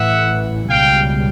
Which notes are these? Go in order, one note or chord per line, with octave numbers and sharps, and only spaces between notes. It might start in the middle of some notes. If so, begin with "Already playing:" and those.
Already playing: A1 A2 E3 E5 F#5
C#2 B2 G3 F5 G5